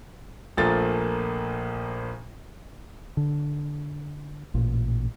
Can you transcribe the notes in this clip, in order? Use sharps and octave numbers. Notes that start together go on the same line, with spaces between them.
A#1 A#2 F3 A3 A#3 A6
D3
A1 A#2